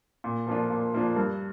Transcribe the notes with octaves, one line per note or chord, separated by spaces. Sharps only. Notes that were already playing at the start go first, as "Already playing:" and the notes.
A#2
F3 A#3 D4 F4
A#2
F3 A#3 D4 F4
G2